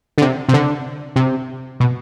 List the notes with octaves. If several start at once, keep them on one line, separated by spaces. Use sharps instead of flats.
D3
C3
C3
D3
C3
B2